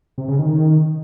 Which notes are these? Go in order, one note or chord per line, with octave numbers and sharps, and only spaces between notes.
C3
C#3
D#3